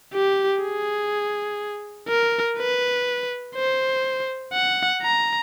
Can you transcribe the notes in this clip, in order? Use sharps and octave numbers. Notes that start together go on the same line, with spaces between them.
G4
G#4
A#4
B4
C5
F#5
A#5